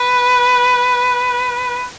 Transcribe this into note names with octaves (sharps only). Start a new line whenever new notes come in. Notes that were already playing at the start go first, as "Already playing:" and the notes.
Already playing: B4